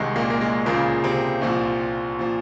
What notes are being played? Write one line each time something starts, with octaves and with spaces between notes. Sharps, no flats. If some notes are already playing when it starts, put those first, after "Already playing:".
Already playing: C2 C3 D#3 G#3
A#2 A#3
A#3
G#3
C#2 A#2 C#3 F3 A#3
C3 C4
C2 A#2 F3
A#2 F3